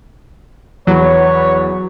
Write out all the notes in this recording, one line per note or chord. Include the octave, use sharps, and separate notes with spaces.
E2 F#3 B4 C#5